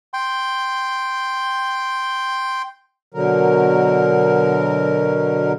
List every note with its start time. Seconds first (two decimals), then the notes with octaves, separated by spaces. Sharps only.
0.14 G5 C6
3.14 B2 D3 F#3 A#4